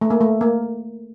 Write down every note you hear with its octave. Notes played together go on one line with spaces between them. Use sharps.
A3
A#3
A3
A#3